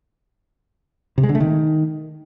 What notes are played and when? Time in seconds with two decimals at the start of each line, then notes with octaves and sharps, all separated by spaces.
1.18 C3
1.23 G#3
1.29 D3
1.35 A3
1.40 D#3